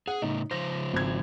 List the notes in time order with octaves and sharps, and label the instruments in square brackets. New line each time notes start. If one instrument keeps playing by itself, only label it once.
[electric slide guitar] G#4 [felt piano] F#5
[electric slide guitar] A2 C#3 [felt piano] D#4
[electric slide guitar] C#3 F3 C5 [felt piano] A#6
[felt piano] G#1 G#6